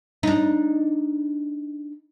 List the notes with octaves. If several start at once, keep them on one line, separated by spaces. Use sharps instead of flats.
D4 D#4